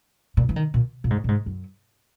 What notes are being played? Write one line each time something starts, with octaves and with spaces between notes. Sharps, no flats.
A#2
E3
D#3
A#2
A#2
G#2
A#2
G#2
F#2